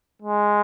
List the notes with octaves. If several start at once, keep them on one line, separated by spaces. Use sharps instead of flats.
G#3